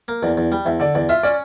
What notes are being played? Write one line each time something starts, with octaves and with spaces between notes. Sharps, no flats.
A#3
E2 D5
E2
G3
E2 E5
D3 D5
E2 D5
F4 E5
C#4 D5